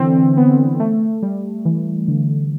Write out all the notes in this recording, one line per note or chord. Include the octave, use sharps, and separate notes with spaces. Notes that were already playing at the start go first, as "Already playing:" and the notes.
Already playing: D3 E3 C4
B3
A3
G3
E3
D3